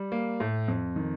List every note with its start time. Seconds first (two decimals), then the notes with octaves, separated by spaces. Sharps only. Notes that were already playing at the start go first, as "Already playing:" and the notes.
Already playing: G3
0.12 A#3
0.40 A2
0.68 F2
0.96 D#3